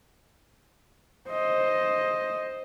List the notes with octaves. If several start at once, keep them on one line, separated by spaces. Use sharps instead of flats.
C5 D#5